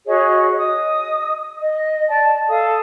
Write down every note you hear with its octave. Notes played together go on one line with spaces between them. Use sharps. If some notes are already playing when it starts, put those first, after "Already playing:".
F#4 G#4 C#5 D#5
D#5 D#6
D#5
D5 A5
A4 F5 D#6